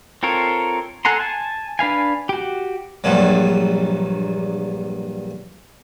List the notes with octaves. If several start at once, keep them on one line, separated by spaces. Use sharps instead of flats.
C4 F4 A4 A#4 C#5
A4 F#5 G#5 A#5 C6
G#5 A5
D4 B4 F5 G#5
F#4 G4
A#1 G2 A#2 F#3